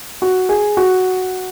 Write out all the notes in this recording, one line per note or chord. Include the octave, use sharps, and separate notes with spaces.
F#4
G#4
F#4